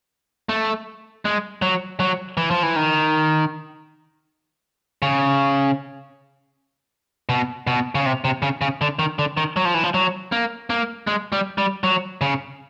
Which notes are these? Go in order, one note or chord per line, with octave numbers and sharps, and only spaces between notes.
A3
G#3
F#3
F#3
E3
F3
E3
D#3
C#3
B2
B2
C#3
C3
C3
C#3
C#3
D3
D#3
D3
D#3
F#3
F3
E3
F3
F#3
A#3
A#3
G#3
G3
G3
F#3
C#3